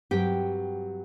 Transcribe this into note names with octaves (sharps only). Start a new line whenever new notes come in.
G2 F#3 C4 G4 G5